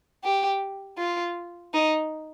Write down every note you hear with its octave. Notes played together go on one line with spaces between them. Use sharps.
G4
F4
D#4